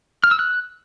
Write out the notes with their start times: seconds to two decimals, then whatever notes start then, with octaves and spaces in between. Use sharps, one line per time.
0.24 F6
0.31 E6
0.39 F#6